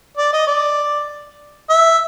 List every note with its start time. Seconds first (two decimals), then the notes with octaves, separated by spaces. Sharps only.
0.17 D5
0.33 D#5
0.47 D5
1.70 E5